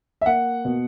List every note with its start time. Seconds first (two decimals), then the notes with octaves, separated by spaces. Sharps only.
0.21 E5
0.26 A#3 F#5
0.65 B2